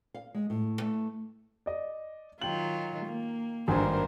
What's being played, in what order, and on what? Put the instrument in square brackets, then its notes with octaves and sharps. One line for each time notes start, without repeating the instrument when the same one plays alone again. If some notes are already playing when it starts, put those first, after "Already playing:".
[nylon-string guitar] F5
G#3
A2
A3
[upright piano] D5 D#5
[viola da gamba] D#3 F#3 F4 [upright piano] G5 F#7
[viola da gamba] A#3
[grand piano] G#1 G2 [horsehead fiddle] A#4 C5 [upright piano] G#5